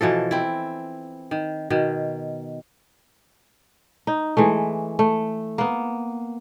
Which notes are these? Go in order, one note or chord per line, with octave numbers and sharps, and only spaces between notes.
B2 E3 F3 A4
C4 E4
D#3
B2 D#3
D#4
E3 G#3 A3
A3
A#3 B3